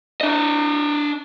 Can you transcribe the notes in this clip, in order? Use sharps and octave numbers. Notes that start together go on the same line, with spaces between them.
D4 D#5